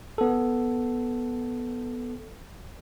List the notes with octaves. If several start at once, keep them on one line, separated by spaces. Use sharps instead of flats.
B3 A4